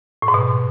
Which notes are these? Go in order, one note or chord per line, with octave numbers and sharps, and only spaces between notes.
A2
G#2
B2